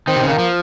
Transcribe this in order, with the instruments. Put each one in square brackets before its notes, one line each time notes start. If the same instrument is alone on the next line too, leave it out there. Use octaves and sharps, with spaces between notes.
[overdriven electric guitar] D#3 [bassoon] C4
[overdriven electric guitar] C3
C#3
[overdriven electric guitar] D#3 [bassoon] A#3
[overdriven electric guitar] F3